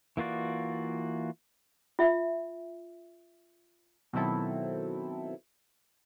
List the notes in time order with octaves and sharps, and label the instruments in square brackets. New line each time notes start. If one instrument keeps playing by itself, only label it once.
[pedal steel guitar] E3 A#3 F4 F#4 D5
[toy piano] F4 E5
[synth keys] B2 D#3 F#3 C4 E4 A4